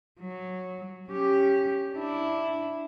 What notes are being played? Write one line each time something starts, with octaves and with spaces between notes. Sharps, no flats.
F#3
C#4 G4
D4 E4